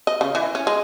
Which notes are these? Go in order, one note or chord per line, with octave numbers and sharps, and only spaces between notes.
D#5
C#3
E3
C#4
G#3